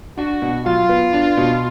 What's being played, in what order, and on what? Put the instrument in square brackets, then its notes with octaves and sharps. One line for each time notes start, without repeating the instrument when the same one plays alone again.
[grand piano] D4 [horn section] F#4
[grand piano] B2
[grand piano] F#3 [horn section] F4
[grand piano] B3
D4
B2